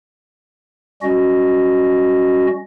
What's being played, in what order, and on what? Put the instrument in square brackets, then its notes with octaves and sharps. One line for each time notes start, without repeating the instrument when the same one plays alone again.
[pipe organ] G3 C#4 F#4 D#5